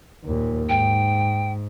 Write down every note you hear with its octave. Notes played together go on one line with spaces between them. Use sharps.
D#2 A#2
G#2 G5